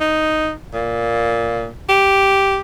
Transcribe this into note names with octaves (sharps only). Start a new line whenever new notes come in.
D#4
A#2
G4